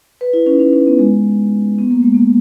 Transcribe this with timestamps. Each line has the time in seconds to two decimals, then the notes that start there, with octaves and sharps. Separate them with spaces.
0.21 B4
0.33 E4
0.46 C#4
0.53 D#4
0.59 C#4
0.73 C#4
0.87 B3
0.99 G#3
1.78 B3
1.91 A#3
2.03 G#3
2.14 A#3